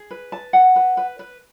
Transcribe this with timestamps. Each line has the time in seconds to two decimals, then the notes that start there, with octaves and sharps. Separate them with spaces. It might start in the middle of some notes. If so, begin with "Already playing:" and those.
Already playing: G#4
0.11 B4
0.32 A5
0.53 F#5
0.76 B4
0.97 B4
1.19 B4